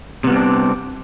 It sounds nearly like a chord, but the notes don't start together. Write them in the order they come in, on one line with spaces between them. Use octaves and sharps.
C3 B3 G3 C4 D4